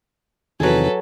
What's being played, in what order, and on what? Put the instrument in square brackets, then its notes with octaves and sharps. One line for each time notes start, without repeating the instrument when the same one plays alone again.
[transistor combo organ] E2 C3 D#3 [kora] F#3 G#4 [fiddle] A4 B4